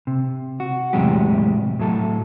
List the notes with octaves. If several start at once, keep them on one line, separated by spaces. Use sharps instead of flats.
C3
F#4
E2 A2 C3 F#3 G#3 G4
A2 F#3 A4